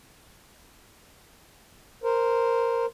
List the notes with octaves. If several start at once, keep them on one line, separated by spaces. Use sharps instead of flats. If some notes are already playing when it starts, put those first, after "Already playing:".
A#4 C5